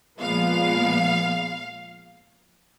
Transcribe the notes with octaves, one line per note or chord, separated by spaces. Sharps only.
A#2 F3 G#3 B3 F5